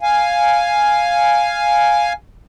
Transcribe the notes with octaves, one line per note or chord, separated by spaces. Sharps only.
F5 G#5